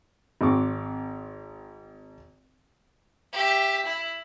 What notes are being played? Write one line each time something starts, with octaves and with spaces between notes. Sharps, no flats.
G#1 C4 C#6 D6
G4 E5
E4